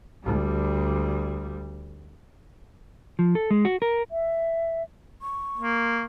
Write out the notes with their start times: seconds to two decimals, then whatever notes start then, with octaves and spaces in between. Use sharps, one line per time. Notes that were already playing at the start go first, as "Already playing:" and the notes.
0.23 D2 G3
3.19 F3
3.35 A4
3.51 G#3
3.65 F#4
3.82 A#4
4.10 E5
5.22 C#6
5.58 A#3